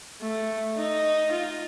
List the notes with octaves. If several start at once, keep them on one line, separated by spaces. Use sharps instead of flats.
A3
D#4
F4